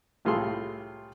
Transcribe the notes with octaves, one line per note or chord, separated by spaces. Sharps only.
C2 A2 F4 G#4 A4 C6